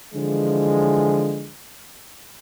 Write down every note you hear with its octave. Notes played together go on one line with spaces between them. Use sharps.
D3 E3 F3 G#3